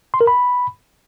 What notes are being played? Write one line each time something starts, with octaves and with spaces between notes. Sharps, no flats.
C6
A#4
B5